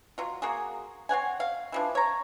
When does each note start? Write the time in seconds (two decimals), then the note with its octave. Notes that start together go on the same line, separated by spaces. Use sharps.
0.18 F#3 F4
0.42 A#3 F#4 G#4
1.09 C4 C#5 F#5 G#5
1.40 F5
1.72 E3 F3 D4
1.95 C#5 A#5